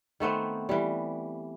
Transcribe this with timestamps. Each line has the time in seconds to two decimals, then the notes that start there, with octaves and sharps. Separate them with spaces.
0.20 D#3 A3 B3 C4
0.69 E3 G3